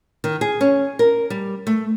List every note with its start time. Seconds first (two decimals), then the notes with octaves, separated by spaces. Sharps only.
0.24 D#3
0.41 G#4
0.61 C#4
0.99 A#4
1.30 G3
1.67 A3